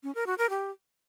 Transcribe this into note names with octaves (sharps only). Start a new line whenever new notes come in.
C#4
A#4
F#4
A#4
G4